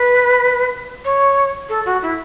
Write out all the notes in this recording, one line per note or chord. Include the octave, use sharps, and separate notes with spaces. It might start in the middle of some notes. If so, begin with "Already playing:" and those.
Already playing: B4
C#5
A4
F#4
E4